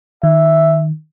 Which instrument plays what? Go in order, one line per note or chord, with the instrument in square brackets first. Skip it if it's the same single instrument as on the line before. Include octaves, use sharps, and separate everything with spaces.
[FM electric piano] D#3 [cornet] E5